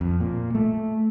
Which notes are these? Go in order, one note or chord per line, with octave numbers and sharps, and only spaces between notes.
F2
A#2
A3